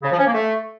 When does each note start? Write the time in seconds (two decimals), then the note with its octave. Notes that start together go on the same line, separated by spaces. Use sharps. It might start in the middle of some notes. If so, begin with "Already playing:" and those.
0.03 C#3
0.10 F3
0.17 C#4
0.25 A#3
0.32 A3